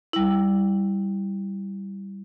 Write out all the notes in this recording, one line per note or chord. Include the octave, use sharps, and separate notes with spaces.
G3 E4